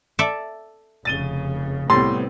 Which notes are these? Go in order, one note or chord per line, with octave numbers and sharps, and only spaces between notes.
A4 D5 E5
F1 C#3 A6 D#7 G7
C2 A2 G3 B3 C4 C6 A6